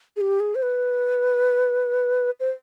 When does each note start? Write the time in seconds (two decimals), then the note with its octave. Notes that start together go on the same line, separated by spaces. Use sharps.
0.16 G#4
0.21 G4
0.40 G#4
0.55 C5
0.63 B4
2.40 C5